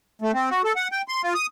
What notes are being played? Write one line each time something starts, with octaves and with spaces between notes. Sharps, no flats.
A3
C4
F#4
A4
F#5
G5
C6
F4
D#6